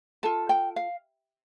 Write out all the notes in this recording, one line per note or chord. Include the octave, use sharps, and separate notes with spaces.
F4 A4 A5
G5
F5